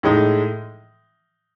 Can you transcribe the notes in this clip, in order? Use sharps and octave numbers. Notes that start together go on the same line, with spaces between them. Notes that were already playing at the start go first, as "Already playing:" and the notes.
A2 G#3 D#4